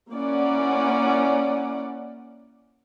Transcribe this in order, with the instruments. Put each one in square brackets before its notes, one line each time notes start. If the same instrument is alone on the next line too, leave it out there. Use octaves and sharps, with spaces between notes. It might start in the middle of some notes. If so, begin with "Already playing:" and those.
[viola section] A#3 C#4 E4 D5 F#5